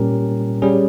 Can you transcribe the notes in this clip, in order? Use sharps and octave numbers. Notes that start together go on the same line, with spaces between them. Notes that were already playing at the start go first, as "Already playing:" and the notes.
Already playing: A#2 G3 C#4 G4 A#4
G3 C#4 G#4